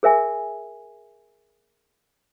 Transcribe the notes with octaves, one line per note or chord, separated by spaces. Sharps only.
G#4 A#4 E5 G#5